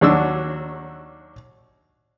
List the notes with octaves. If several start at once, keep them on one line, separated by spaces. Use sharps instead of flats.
D#2 F#3 D4 F#4 E6